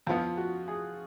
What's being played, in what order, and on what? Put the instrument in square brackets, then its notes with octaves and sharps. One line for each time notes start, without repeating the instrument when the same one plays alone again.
[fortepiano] F2 F3 B3 [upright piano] F4
[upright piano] F#4
G#4